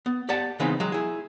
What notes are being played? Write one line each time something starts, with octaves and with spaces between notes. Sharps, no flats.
B3
G4 D5 F#5 A5
C#3 E3 G#3 B3 C4 D#4
F#3 G#3
E4 G#4